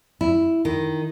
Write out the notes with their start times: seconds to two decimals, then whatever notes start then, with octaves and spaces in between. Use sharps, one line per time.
0.21 E4
0.65 D#3